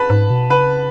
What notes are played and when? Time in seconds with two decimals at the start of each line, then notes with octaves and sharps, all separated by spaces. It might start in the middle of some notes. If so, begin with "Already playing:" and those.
Already playing: B4 A5 B5
0.10 G#2
0.30 B2
0.50 C#3 B4 B5